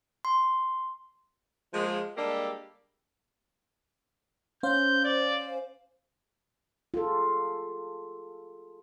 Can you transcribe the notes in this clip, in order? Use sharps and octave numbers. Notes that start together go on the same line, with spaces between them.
C6
F3 G#3 A#3
G3 G#3 A#3 D4 G4 A4
C#4 C5 F5 G6
D5
F4 G#4 A4